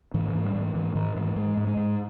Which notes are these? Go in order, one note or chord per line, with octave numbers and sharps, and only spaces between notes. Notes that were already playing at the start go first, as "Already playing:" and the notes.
G#2 E3
E3
G#2
G3
G#2 E3
G#2 E3
G#2 D#3
G#2 E3
G#2 G#3
G#2
G#3
G#2